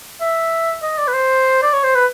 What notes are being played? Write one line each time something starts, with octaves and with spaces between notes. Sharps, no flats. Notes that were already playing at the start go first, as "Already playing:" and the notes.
E5
D#5
D5
B4
C5
D5
C#5
C5
B4